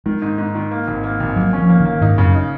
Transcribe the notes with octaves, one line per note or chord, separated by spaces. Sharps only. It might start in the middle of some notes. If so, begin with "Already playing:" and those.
D#3 G#3
G#2
G#2
D#3
A#3
G#1
A#3
G#1
F#3 A#3
F3 C#4
A#3
D#3
A#3
G#2 D#4
F#2 C#3
D#4